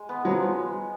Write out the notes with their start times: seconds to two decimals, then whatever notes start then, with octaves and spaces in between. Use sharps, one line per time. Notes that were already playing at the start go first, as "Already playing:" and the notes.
Already playing: G#3
0.09 B3
0.25 F3 F#3